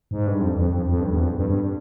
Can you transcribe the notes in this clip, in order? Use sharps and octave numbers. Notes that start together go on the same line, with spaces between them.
G#2
G2
F2
F2
F2
F2
G2
E2
F2
F2
G2
G2